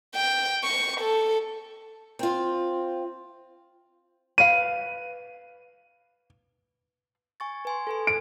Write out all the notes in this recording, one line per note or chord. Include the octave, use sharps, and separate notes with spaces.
G5
C#6
A4
C4 F4
B4 F5 D#7
G#5 C#6 A6
B4 G#5 C6
A4 B4 G#5
D7